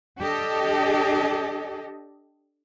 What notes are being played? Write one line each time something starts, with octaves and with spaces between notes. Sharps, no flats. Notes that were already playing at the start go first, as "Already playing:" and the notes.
D4 G4 A4 D#5